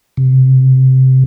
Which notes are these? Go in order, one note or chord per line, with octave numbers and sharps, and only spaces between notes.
C3